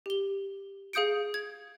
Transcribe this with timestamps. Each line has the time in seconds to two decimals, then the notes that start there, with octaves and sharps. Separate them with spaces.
0.06 G4 G7
0.93 G#4 F5 D#6 G6 C#7 D7
1.34 G#6